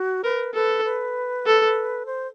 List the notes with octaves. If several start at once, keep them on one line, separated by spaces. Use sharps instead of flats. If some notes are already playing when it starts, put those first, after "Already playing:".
Already playing: F#4
A#4 B4
A4 B4
B4
A4
C5